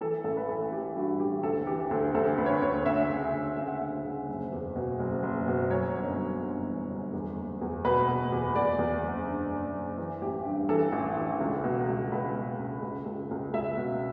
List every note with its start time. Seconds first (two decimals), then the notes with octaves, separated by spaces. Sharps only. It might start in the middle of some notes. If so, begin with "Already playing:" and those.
0.01 E3 A4
0.24 A1 A4
0.37 B4
0.49 E3 A4
0.72 E3 G4
0.95 G2 F#4
1.20 A1 G4
1.43 D2 A4
1.67 E3 G4
1.91 D2 A4
2.14 D2 A4
2.38 D2 B4
2.46 C#5
2.53 B4
2.62 D2 C#5
2.86 D2 E5
3.10 C#3
3.33 D2
3.57 C#3 E5
3.68 F#5
3.78 D2 E5
4.05 C#3
4.28 F#1
4.52 E2
4.76 B2
4.99 F#1
5.23 F#1
5.48 B2
5.71 F#2 C#5
5.95 G1
6.18 F#2
6.41 G1
6.66 E3
6.89 G1
7.13 E2
7.36 F#1
7.61 E2
7.84 B2 B4
8.08 B2
8.32 E2
8.56 E2 D5
8.79 E2
9.03 F#1
9.27 D3
9.50 F#1
9.75 F#1
9.97 E3
10.22 A1 G4
10.45 G2
10.69 E3 A4
10.92 A1
11.17 E3
11.41 C#2
11.64 B2
11.88 C#2
12.12 C#2 B4
12.35 B2
12.59 C#2
12.82 C#2
13.06 C#2
13.31 C#2
13.54 C#2 E5
13.77 B2